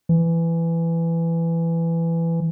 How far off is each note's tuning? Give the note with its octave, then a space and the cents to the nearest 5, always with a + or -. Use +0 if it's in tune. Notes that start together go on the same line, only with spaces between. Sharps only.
E3 +15